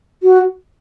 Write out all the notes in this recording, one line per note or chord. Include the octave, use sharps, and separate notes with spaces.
F#4